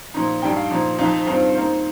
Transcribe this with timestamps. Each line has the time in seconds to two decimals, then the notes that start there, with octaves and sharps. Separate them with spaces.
0.14 A#2 F3 D#4 A#5
0.42 G2 G3 D#4 G5
0.56 F5
0.71 A#2 F3 D#4
0.99 F2 F3 D#4 F5
1.27 G2 D#3 C4 F4 C5
1.55 D#3 A#3 D#4 C5